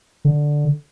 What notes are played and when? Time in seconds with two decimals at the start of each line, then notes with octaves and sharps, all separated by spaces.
0.25 D3